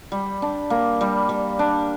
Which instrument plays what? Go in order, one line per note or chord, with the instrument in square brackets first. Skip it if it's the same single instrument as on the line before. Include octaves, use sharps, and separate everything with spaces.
[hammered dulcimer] G3
D4
A#3
G3
G3
D4